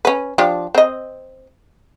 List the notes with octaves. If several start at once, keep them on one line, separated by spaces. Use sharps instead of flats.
C#4 B4
F3 D4 G4
C4 D#5